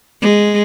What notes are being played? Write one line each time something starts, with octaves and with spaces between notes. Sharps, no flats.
G#3